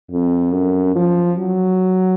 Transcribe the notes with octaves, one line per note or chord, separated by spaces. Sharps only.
F2
F#2
F3
F#3